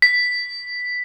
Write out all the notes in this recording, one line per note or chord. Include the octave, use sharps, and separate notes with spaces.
B6